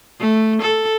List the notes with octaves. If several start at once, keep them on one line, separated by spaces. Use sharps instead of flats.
A3
A4